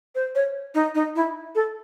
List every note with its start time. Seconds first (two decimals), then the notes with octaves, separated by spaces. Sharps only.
0.15 C5
0.35 C#5
0.75 D#4
0.95 D#4
1.16 E4
1.55 A4